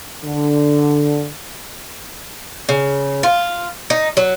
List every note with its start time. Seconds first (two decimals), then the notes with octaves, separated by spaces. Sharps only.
0.24 D3
2.69 C#3
3.23 F4
3.90 D#4
4.17 F#3